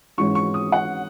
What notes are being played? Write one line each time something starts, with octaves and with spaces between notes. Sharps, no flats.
G#2 E3 G#3 C#4 C#6
C#6
D#6
F#5